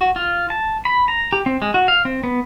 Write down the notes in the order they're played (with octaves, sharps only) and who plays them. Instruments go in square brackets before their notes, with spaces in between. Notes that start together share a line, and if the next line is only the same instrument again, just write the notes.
[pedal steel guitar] F#4
F4
A5
B5
A#5
G4
C4
G#3
F#4
F5
C4
B3